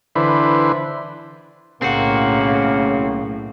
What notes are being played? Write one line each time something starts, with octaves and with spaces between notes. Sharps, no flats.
D3 E3 B4 C5
B1 A2 C#3 A#3 C4 F#4